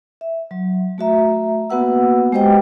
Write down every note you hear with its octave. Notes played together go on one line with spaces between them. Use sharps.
E5
F#3
A3 F#4 E5 A#5
A#3 B3 F#4 B4 F#5 E6
G#3 G4 B4 C5 D#5 G5